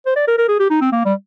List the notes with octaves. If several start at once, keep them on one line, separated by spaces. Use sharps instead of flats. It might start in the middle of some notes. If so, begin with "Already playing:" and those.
C5
D5
A#4
A#4
G#4
G4
D#4
C4
A#3
G3